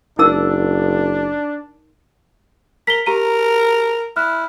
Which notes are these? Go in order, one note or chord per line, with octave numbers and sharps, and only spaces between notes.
F#1 D4 D#4 A#4 E6
A#4 B6 G7
G4 A#4 A#5 D#7
E4 F6 F#6